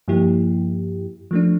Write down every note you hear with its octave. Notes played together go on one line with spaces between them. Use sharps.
G2 F3 A#3 E4 G4
F3 A3 D4